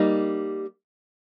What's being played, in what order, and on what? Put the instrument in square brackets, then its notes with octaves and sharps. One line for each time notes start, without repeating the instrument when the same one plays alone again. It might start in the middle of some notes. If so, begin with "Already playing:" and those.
Already playing: [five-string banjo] G3 A#3 D#4